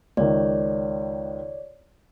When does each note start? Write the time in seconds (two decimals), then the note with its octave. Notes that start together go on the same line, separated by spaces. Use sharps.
0.17 C#2 D#3 C#5 D5